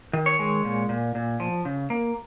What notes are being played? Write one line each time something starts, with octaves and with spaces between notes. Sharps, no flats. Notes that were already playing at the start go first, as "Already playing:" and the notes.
D#3
C#5
G#3
A#2
A#2
A#2
F3
C#3
A#3